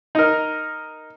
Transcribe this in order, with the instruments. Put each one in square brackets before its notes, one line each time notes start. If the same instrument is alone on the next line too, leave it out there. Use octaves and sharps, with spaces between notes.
[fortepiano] D#4 A#4